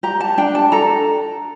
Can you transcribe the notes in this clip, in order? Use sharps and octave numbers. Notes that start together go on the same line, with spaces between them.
G4 A#5
A5
D4 G5
A5
A4 A#5